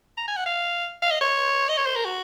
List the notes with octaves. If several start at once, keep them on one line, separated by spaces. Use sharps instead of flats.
A#5
G#5
F#5
F5
F5
D#5
C#5
D#5
C#5
C5
A#4
F#4